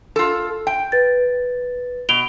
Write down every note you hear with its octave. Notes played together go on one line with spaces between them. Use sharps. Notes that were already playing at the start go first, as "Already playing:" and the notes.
F4 A4
G5
B4 A6
B2 D7 F7 G7